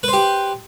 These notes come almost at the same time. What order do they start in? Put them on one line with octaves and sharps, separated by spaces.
B4 C5 G4